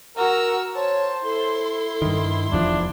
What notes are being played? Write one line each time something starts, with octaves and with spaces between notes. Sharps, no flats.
F#4 A#4 E6
C5 C#5 A5
E4 A4 C6
G2 D#3
F1 E2 F3 D4 E5